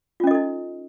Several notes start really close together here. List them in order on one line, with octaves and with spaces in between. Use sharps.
F4 C#4 D#5 A4 D#4